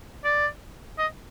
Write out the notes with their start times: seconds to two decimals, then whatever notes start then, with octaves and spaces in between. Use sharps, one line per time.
0.24 D5
0.98 D#5